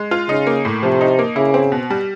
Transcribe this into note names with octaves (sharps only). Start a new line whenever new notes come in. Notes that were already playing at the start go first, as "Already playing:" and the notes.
Already playing: G#3
F4
C#3 D#4
A#3
A2
C3 F3
D#4
A#3
C#3 E4
C4
B2
G3